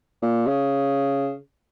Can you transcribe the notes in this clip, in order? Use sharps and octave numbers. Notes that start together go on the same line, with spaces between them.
A#2
C#3